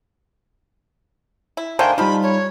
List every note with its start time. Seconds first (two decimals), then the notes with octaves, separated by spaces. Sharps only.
1.57 E4
1.79 D#3 A3 D4 C5 F5 G5 G#5
1.98 F3 G3 D#4 F4 B5
2.23 C#5